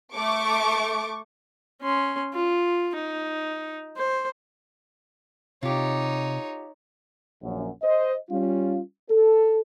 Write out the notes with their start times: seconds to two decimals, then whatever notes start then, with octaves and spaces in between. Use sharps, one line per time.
0.14 A3 C#6 D6 D7
1.82 C#4 C6
2.34 F4
2.96 D#4
3.96 C5
5.63 C3 D#4 F4 G4 C#5
7.43 A#1 F#2
7.83 C5 D#5
8.30 G3 C#4 F4
9.10 A4